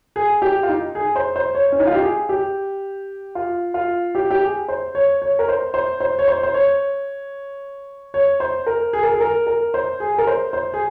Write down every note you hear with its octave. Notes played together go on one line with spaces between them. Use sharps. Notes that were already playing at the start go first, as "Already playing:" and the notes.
G#4
G4
F4
D#4
G#4
C5
C5
C#5
C#4
D#4
F4
G4
G#4
G4
F4
F4
G4
G4
G#4
C5
C#5
C#5
A#4
C5
C5
C5
C#5
C5
C5
C#5
C#5
C5
A#4
G#4
A#4
G#4
A#4
A#4
C5
G#4
A#4
C5
C5
G#4